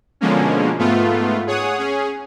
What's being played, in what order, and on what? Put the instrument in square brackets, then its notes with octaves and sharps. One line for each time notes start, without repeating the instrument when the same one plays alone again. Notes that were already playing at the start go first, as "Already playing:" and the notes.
[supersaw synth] B2 D3 F3 G#3 A#3 C#4
G#2 A3 B3 F4
G#4 C#5 F#5 D#6
C#4 G#4